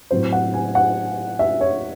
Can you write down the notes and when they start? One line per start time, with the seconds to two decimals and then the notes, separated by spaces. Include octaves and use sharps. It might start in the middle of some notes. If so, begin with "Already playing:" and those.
0.11 A2 F#3 C4 C5
0.32 F#5
0.54 G#5
0.75 F#5
1.39 E5
1.61 C#5